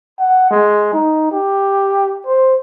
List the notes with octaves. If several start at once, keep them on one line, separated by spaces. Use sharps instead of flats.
F#5
G#3
D#4
G4
C5